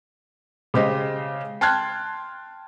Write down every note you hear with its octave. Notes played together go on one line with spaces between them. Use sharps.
C#3 G#3 G4 C5 D#5
G5 A5 C6 F6 F#6 G#6